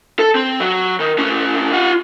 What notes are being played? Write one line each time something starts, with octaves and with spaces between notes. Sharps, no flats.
A4
C4
F#3
D#3
A2 C#4
F4 F#5